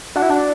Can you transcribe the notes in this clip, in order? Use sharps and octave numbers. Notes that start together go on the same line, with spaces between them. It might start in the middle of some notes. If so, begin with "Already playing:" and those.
D4 F#4
E4
D4